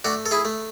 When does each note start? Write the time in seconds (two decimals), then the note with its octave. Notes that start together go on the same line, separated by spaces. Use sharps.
0.05 A3 D4 F#4
0.26 A4
0.31 E4 G#4
0.45 A3